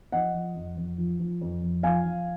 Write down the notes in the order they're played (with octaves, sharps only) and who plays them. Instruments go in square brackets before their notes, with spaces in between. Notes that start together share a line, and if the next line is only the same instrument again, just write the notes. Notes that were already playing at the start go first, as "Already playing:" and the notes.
[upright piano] F3 D#5 F#5
F3
F2
F2
F3
F3
F2
F2
F3 F5 G#5
F3